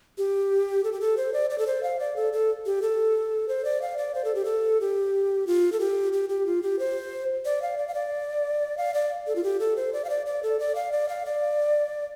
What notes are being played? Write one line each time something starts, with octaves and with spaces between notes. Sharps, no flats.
G4
A4
G4
A4
C5
D5
D5
A4
C5
F5
D5
A4
A4
G4
A4
C5
D5
F5
D5
C5
A4
G4
A4
G4
F4
A4
G4
G4
G4
F4
G4
C5
D5
F5
D5
F5
D5
F5
D5
A4
F4
G4
A4
C5
D5
F5
D5
D5
A4
D5
F5
D5
F5
D5